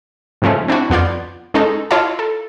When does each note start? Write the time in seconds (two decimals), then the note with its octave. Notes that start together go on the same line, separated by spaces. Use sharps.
0.42 G#2 C#3 F3 A3 C#4
0.68 C4 D4 E4 F#4
0.90 F2 B3 F4 D5 G6
1.54 G#3 C#4 D#4 A4
1.91 E4 F4 C#5 D#5 F5 A5
2.19 A4